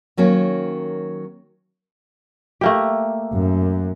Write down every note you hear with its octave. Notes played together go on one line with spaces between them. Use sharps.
D#3 F#3 A#3 C#4
A3 A#3 G4
F#2